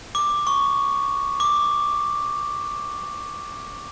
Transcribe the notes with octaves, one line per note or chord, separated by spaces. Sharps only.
D6
C#6
D6